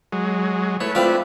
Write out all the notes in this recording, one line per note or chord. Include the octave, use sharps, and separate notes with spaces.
F#3 G#3
A3 E4 B4 C#5
C4 F4 D5